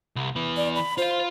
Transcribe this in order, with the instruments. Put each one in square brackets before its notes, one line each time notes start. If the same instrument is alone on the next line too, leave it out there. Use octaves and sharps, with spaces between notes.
[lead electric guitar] C2
E3 B3
[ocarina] D5
B5
[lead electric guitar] F4 F5 [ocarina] C5